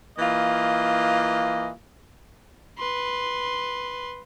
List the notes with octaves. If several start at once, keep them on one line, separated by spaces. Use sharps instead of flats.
E3 A#3 F4 D#5
B4 C6